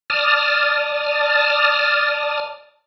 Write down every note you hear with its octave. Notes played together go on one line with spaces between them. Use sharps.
D5 A5 D#6 F6